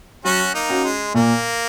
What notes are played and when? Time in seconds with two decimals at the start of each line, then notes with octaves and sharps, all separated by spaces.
0.24 F#3 C#4 F#4
0.54 A#3 D#4
0.69 C#4 F#4
0.84 G#3
1.14 A#2 A#3